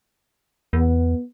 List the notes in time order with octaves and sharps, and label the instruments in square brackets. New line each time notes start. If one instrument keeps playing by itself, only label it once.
[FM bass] E2 [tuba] B3